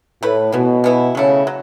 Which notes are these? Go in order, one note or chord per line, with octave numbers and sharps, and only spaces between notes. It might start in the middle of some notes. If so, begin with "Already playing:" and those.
A2 A3 E4 B4
B2 E3 B3 E4
E3 B3 E4
C#3 F#3 A3 E4
F#3